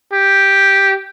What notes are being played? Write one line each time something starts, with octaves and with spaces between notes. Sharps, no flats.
G4